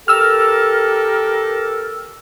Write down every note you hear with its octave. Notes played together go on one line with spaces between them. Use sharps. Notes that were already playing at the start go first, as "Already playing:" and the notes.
G4 A4 A#4 E6 F6